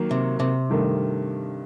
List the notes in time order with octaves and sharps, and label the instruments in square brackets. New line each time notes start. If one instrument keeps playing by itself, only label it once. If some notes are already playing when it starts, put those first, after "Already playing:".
Already playing: [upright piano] D#3 F#3 A#3
[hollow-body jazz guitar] C3
C3
[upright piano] G2 D#3 A3